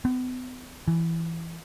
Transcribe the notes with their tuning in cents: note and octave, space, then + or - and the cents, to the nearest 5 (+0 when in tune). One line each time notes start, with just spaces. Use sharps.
B3 +40
E3 +10